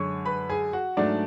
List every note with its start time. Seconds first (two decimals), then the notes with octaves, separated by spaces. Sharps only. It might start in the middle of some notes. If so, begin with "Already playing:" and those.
Already playing: F#2 D3 G#3 C#5 C#6
0.26 B4 B5
0.49 G#4 G#5
0.73 F#4 F#5
0.97 G#2 F#3 A3 D4 D5